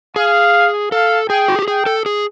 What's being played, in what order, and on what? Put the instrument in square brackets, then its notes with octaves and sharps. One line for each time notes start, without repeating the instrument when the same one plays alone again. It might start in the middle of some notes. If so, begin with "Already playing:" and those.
[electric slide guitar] G#4 [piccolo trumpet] F5
[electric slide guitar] A4 [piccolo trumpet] F5
[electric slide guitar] G#4 [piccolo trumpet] G5
[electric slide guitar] F#4
G4
[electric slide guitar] G#4 [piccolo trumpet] G5
[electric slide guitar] A4
G#4